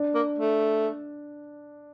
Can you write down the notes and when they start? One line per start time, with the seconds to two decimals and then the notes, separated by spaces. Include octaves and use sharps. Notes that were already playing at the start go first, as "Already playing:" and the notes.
Already playing: D4
0.15 A#3
0.39 A3